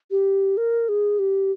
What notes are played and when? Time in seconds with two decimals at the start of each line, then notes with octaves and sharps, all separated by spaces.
0.11 G4
0.57 A#4
0.89 G#4
1.19 G4